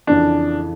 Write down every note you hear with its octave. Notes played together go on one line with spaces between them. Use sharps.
F2 C#3 E3 D4